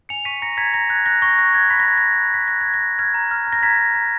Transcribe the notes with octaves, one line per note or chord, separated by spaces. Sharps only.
G#5 C#7 F7
C#6 B6 D#7
A#5 A#6 C#7
A#5 G#6 B6
A#5 A#6
F#6 G#6
F#6 A#6
C#6 A#6
F#6 A#6
C#6 G#6
B5 B6
A#6
B5 G#6
F#6 A#6
B5
F#6 B6
F#6 A#6
G#6
F#6
A#6
F#6
F6 G#6
A#5
F6
A#5
A#6
A#5 G#6 B6
A#5
A#5